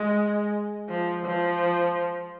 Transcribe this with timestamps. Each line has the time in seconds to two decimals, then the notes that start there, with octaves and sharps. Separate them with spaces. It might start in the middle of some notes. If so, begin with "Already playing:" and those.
Already playing: G#3
0.89 F3
1.25 F3